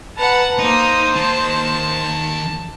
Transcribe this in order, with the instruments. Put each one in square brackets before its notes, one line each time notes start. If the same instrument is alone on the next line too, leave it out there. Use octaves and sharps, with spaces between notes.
[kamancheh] B4 A5 [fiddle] F#5 A#5
[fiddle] A#3 D#6 [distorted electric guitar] D#4 [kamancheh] C5
[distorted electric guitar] D#3 A#3 [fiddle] A5